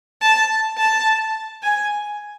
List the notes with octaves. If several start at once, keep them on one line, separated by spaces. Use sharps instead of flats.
A5
A5
G#5